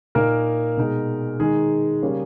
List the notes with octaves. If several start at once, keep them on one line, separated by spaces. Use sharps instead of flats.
A#2 A#3 D#4 A#4
B2 G#3 D#4
D#3 G#3 D#4 G#4
C#3 G3 A#3 C#4